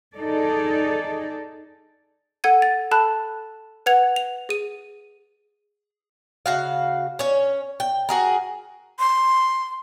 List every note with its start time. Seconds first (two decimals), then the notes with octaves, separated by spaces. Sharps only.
0.14 D#4 G#4 A4 D5
2.44 A4 F#5 G#6 D#7
2.62 A6
2.91 A4 A5 B5 F#6
3.86 B4 F#5 G#6 F7
4.16 F7
4.49 G#4 D#7
6.46 C#3 F#4 F5
7.19 C#4 C#5
7.80 G5
8.09 F#4 G#4 A#4
8.99 C6